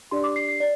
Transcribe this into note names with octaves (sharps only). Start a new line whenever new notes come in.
D4 G4 D5 C6
D6
C7
C7
D5